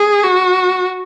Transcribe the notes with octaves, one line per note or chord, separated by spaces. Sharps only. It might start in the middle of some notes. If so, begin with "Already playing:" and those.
Already playing: G#4
F#4